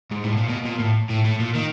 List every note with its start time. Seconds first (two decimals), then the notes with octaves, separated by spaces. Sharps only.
0.11 G#2
0.24 A2
0.37 A#2
0.49 B2
0.65 A#2
0.79 A2
1.09 A2
1.25 A2
1.40 A#2
1.55 D#3